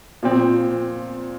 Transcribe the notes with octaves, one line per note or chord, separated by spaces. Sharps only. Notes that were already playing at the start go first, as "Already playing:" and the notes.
A#2 F3 C4